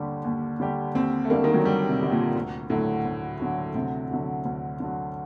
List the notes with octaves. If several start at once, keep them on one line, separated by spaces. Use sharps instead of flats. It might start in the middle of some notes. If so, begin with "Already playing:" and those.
Already playing: D#2 D3 G3 D4 G4
D#2
D3 G3 D4 G4
D#2 C4
A3
D3 G3 A#3 D4 G4
D#3
F#3
D#2 G3
C3
D3 G3 D4 G4
A#2
D2
A2 D3 F#3
D2
D3 F#3
D2 C3
D3 F#3
D2
D3 F#3